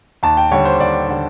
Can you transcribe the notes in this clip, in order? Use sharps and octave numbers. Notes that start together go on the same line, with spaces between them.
D#2 A5
G5
D3 G3 C#5
C5
D#2 D5
D3 G3